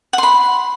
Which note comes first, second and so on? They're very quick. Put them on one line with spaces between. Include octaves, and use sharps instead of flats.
F#5 C6 B5